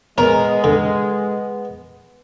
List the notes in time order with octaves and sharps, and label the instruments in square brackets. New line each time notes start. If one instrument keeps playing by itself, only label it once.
[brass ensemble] G#3 [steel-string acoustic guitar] B3 [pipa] A#4 [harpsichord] C#5
[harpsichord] D3